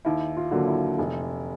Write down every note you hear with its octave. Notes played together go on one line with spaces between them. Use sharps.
D#2 E4
F4
D3 F#3 A#3
E4
F1